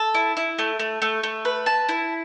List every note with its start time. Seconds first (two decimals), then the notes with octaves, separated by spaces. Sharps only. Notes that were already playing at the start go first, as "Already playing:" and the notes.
Already playing: A4
0.15 E4
0.37 E4
0.59 A3
0.79 A3
1.02 A3
1.23 A3
1.45 B4
1.66 A5
1.89 E4